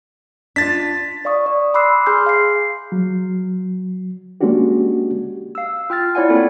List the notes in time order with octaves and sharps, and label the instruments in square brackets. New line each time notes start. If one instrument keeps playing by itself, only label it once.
[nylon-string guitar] D4 F4 [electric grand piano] A6 B6
[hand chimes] D5 F5 C#6 D#6
D5
B5 C6 D6 E6 F#6 C7
G#4 G#5 C6 F6 G6
F5 C7
[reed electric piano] F#3
G#3 A#3 C#4 D4 F#4 G4
[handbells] F5 E6
F4 G5 F6 A6
E4 C#5 D5 F#5 G#5
A#3 C4 E4 F4 A4